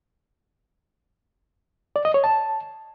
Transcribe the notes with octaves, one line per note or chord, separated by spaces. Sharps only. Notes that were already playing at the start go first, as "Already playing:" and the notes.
D5
D#5
C#5
A5